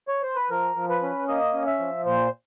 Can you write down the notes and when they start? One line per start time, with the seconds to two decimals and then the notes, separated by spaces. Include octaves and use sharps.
0.08 C#5
0.22 C5
0.36 B4
0.50 F3 A#4
0.76 F3
0.89 B4
1.02 C#4
1.28 A#3 D#5
1.54 C#4
1.67 E5
1.79 F3
2.05 A#2 C5